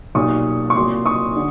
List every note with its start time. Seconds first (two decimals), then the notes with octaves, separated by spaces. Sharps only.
0.15 B1 A#2 G3 C#6 D#6
0.70 C#6
0.75 C2 A#2 F#3 C6 D6
1.06 C#6 D#6
1.36 D3